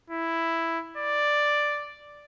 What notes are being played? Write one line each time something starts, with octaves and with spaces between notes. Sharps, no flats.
E4
D5